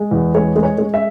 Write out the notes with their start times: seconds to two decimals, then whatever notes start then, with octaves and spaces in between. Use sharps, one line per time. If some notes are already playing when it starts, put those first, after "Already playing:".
Already playing: G#3
0.11 E2
0.35 G#3 C#5
0.56 G#3
0.63 C#5
0.78 G#3
0.94 E5